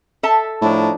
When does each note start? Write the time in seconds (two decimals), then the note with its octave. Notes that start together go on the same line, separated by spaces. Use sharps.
0.23 A4 E5 A5
0.61 A2 F3 D4 D#4